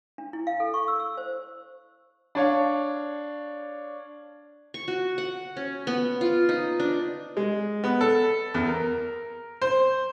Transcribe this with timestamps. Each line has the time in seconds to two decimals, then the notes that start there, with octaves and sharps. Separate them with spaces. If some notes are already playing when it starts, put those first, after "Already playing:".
0.18 D4
0.33 E4
0.47 F5
0.60 A4
0.74 C#6
0.88 E6
1.00 E6
1.17 C5
2.35 D4 C#5 F5
4.74 C#6
4.88 F#4
5.18 F#5
5.57 C#4
5.87 B3
6.21 F4
6.49 D#4
6.80 D4
7.37 G#3
7.84 B3
8.01 A4
8.54 E2
8.67 A#4
9.62 C5